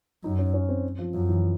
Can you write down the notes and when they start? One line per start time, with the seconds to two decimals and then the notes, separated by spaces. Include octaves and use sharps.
0.24 F#2 D#4
0.39 C#4
0.54 C#4
0.69 C4
0.99 F3
1.14 F#2 F3
1.29 E3